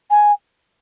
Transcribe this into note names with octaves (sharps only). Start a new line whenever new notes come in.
G#5